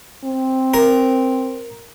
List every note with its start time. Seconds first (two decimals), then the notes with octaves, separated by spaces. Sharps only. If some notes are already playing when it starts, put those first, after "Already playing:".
0.24 C4
0.74 A#4